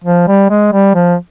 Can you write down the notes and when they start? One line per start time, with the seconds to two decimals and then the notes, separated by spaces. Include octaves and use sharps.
0.04 F3
0.28 G3
0.50 G#3
0.73 G3
0.94 F3